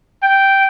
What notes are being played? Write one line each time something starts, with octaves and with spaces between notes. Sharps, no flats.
G5